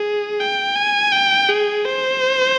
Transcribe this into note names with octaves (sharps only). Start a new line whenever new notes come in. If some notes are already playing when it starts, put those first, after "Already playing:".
Already playing: G#4
G5
G#5
G5
G#4
C5